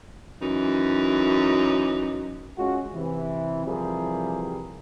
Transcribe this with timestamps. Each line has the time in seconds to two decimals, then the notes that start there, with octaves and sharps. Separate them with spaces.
0.41 F#2 E3 D#4
2.58 G#3 C#4 F4 F#4
2.94 C3 E3
3.66 C3 E3 F3 G3 G#4 A#4